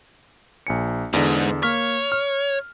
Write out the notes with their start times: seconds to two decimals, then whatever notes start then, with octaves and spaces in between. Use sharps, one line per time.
0.67 A#1 G#5 C#7
1.13 E2 G#2 D3
1.63 A#3 C#5 F6 B6
2.12 F6